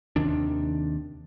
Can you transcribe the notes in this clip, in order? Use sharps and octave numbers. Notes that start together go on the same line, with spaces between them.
D#2 C3 D#3 D4